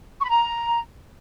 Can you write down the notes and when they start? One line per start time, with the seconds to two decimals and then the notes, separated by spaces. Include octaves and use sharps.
0.19 C#6
0.25 B5
0.30 A#5